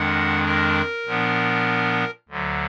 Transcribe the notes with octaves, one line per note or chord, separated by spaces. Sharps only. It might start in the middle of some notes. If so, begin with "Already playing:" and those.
Already playing: F2 D#3 G#3 D4 F#5
A#4
A#2 F3 B3 D4
D2 D3 F#3